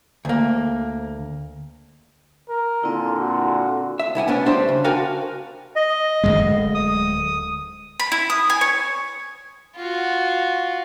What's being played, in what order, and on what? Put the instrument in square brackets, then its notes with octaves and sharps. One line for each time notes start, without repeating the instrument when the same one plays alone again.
[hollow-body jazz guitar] D2 A#3
[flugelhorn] A#4
[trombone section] A#2 D3 [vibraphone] C4 E4
[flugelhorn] F#4
[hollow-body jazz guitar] E5
C2 E4 F#5 G#5
B3 C#4 D4
G3 D4 C5 E5
C#3
D4 F#4 A#4 F5 G5 G#5
[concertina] D#5
[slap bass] D1 E2 G#3
[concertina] D#6
[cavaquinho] B5
E4
D#6
G#5
C#5
[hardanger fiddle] F4 F#4